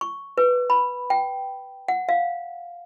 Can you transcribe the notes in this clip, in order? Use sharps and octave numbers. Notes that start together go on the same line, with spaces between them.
C#6
B4
B5
G5
F#5
F5